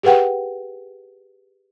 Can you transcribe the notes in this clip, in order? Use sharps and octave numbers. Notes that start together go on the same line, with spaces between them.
G4 G#4 B4 F#5 G5